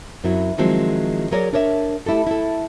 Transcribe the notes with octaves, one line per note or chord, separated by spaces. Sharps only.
F#2 F#3 C4 E4
D#3 F3 F#3 G#3 C4 E4
F#3 F#4 G#4 A#4 C#5 D5
D4 A#4 C#5 D5 E5
A3 E4 G4 A4
E4 A4